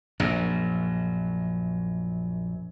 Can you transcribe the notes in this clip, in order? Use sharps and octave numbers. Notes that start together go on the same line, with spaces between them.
A#1 F#2